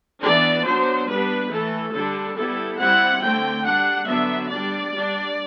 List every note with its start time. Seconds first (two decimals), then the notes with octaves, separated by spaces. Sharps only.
0.22 E3 B3 D4 D5
0.64 F#3 B3 D4 C5
1.07 G3 B3 D4 B4
1.50 E3 A3 E4 A4
1.93 D3 G3 D4 A4
2.36 G3 B3 E4 A4
2.78 G3 C4 E4 F#5
3.21 D3 A3 C4 G5
3.64 G3 D4 F#5
4.07 D3 F#3 B3 D4 E5
4.50 G3 D4 D5
4.92 G3 D4